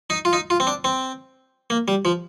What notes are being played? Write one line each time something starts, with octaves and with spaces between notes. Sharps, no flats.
D#4
F4
D#4
F4
C4
D4
C4
A#3
G3
F3